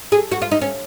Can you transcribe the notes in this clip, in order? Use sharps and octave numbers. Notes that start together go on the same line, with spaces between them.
G#4
F#4
F4
D#4
C#4